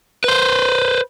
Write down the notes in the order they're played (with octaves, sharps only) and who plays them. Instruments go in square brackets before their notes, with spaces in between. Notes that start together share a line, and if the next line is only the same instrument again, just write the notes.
[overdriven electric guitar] B4 C5